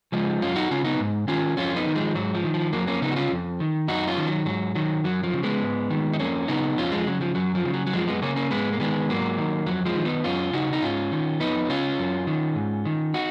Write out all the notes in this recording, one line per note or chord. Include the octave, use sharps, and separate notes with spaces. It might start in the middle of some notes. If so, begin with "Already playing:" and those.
C#3 F3 G#3
F#2 C#4 F4
D#4 F#4
C#3 C#4 F4
B3 D#4
G#2
D#3 C#4 F4
F2 C#4 F4
B3 D#4
D#3
F3 G#3
G#2 F#3
F3
D#3
F3
F2 F#3 A#3
A#3 C#4
C#3 B3 D#4
F#4
C#4 F4
F2
D#3
F#2 D#4 F#4
C#4 F4
D#3
F#3
G#2 F#3
D#3 F#3
F#2 F#3
F3
C#3
G#3 B3
G#2
D#3
D#4
F2 A#3 C#4
C#3 B3 D#4
F2 C#4 F4
F3 G#3
C#3 F#3
F3
F#2 F#3
F3
C#3
F#3
F#3
F#2 F3 G#3
G#3 B3
C#3 A#3 C#4
A#3 C#4
G#2 G#3 B3
A#3
D#3 G#3 B3
G#2 F#3 A#3
D#3
F2 F#3
F3 G#3
D#3
B3 D#4
F#2 C#4 F4
C#3 D#4 F#4
D#4
G#2 C#4 F4
D#3
F2 B3 D#4
C#3 C#4 F4
F#2
D#3
G#2
D#3
D#4 F#4